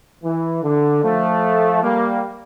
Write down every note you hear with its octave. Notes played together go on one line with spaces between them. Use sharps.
E3
D3
F3 A3
G3 A#3